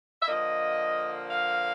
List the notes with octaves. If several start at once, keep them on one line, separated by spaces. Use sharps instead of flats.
E5
D3 F3 A#3 D#5
F5